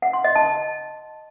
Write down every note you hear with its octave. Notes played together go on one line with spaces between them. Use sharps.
F#5
C6
D#5
A5